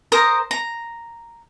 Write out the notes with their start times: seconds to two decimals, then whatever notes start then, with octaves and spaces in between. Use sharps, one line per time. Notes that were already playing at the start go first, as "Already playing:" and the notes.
0.12 A#4 C5 A#5 D#6
0.51 A#5